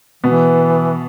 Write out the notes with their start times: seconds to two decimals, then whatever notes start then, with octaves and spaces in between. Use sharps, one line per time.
0.24 B2 E3 B3